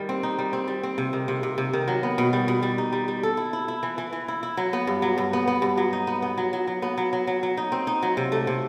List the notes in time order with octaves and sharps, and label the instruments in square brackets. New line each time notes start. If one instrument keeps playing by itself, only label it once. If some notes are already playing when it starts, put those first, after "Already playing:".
Already playing: [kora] D#3 G3
C4
D#4
G3
C4
G3
C4
C3
D#3
C3
C3
C3
D#3
F#3
B3
B2
G3
B2
G3
D#4
G3
G3
A4
E4
E4
E4
E3
E3
E3
E4
E4
F#3
B3
G2
F#3
G2
B3
B3
G2
F#3
D#4
B3
B3
F#3
F#3
F#3
B3
F#3
F#3
F#3
F#3
D#4
C4
D#4
F#3
C3
A3
C3